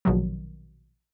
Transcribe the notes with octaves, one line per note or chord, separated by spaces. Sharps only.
A#1 B2 D#3 F#3